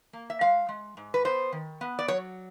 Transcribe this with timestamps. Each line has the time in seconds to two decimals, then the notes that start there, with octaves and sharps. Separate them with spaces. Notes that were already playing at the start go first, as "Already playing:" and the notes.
0.13 A#3
0.30 E5
0.41 G#3 F5
0.69 G#3
0.97 G#2
1.14 B4
1.25 B3 C5
1.52 D#3
1.81 B3
1.99 D5
2.08 F#3 C#5